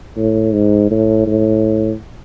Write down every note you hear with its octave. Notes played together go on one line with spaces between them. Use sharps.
A2
G#2
A2
A2